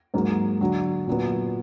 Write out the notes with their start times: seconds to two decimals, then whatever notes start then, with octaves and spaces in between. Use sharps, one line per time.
0.14 G#2 F#3 A#3
0.61 D3 F#3 D4
1.07 A#2 F#3 B3